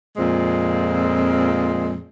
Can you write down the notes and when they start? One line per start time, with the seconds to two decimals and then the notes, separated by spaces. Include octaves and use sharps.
0.17 F2 A#2 G#3 C4